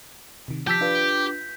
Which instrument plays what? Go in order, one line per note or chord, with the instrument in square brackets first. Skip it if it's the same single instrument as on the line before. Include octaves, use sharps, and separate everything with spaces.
[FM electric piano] C3 D#3
[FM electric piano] F3 A5 E6 [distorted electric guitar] G4 [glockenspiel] G6 B6
[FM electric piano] D4 F4 B4